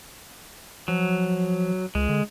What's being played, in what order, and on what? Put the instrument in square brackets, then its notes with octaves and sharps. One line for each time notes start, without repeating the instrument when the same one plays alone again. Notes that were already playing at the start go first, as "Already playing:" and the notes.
[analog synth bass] F3 [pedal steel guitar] F#3
[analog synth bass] C#2 [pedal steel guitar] G#3
[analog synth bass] D3